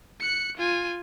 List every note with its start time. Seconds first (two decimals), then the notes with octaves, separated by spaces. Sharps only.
0.20 F#6 C#7
0.57 F4 G#5